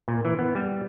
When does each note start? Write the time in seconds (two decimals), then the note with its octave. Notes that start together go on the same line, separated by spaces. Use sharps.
0.08 A#2
0.25 E3
0.39 B3
0.55 G3